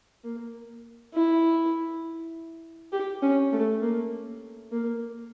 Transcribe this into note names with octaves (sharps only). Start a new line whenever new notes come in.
A#3
E4
G4
C#4
A3
A#3
A#3